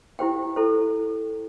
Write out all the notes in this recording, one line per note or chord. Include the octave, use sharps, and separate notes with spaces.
E4 G4 C5 G5
E4 A4 C5